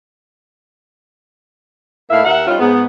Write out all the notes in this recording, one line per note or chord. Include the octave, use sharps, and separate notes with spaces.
A2 A#3 D#4 E4 E5 F5
D#2 A#4 E5 F#5
G3 C#4 D#4 F4
G#2 B3